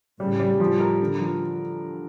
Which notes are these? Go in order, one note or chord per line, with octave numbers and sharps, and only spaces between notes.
A2 C#3 G3
G3
F3
A#4
D3
F3